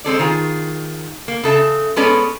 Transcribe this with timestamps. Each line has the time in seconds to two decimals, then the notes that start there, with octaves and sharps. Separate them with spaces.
0.04 G#3 C4 A4 D5
0.19 D#3 F4 G#4
1.28 A#3
1.43 C#3 A4 E5 A5
1.96 G#3 B3 C#4 A4 B4 D5